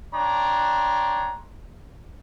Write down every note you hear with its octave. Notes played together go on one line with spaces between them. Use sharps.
D4 C#5 G5 A#5 C6